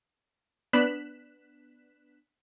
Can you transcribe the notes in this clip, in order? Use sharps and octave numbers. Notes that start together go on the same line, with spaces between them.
B3 D4 F#6 B6 E7